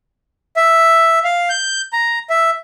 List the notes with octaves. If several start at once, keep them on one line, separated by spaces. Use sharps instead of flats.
E5
F5
G6
A#5
E5